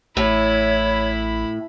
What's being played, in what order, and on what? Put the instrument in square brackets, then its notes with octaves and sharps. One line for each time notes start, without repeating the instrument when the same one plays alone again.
[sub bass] A1 [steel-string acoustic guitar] A2 [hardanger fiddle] E4 B5 [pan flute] C#5